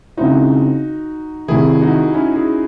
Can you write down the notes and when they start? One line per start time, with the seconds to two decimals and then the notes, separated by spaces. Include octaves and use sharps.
0.17 C#3 G#3 C4 D#4 E4 F#4
1.48 C2 C3 D#3 E4 G#4
1.82 D#4 F#4
2.14 C#4 E4
2.36 E4 G#4